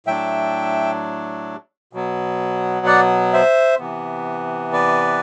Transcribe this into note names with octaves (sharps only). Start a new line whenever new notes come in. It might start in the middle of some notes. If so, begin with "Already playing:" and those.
A2 F#3 A3 D4 E5 G5
B2 F#3 B3
D5 F#5
C5 E5
C3 E3 B3
B4 D5